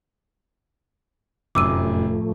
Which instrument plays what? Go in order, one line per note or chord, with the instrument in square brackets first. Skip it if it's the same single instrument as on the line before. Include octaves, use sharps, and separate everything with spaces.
[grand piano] F1 F#2 [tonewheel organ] A2 F3 A3 [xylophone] D6 E6 D#7